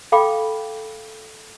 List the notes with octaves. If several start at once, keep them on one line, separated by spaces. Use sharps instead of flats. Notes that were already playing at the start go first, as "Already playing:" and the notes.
A4 F5 G5 B5 D6